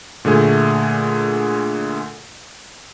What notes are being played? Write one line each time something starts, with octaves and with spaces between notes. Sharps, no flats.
A#2 D3 A3 G#4